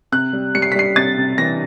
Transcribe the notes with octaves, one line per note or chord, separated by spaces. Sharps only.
C3 F#6
G3
G3 C#7
C7
B6
G3 C7
C3 A6
C3
E3 A#6